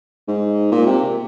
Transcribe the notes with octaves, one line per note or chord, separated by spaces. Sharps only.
G#2
A#2
C3